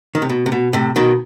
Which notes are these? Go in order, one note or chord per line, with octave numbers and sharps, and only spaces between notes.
D#3
C3
B2
C3
B2
A2 C3
B2 D#3